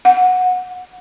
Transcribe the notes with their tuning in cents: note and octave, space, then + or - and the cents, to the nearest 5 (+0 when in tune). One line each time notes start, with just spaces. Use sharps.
F#5 -15